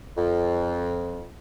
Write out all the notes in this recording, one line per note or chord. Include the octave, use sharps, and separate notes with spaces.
F2